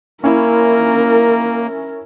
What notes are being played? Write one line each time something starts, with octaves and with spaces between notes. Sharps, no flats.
A#3 C#4 E4 A#4